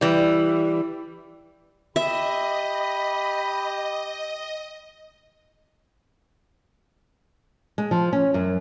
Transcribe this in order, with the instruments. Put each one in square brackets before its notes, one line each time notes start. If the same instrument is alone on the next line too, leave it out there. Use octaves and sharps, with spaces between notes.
[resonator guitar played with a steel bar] E3 G3
[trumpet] G4 [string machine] D#5 [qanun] E5 [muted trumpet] B5
[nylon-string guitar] G#3
F3
C#4
F#2